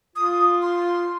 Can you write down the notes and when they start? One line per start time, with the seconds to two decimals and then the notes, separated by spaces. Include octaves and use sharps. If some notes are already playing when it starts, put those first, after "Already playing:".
0.16 F4 D#6
0.62 C6